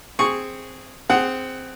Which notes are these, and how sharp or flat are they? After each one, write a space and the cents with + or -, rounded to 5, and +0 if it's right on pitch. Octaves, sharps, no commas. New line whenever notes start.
C4 +0 G#4 -5 C#6 +0
C4 -5 G#4 +0 F#5 +15